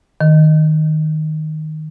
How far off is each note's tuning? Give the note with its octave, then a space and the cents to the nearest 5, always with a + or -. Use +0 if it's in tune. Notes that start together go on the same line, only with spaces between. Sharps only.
D#3 +0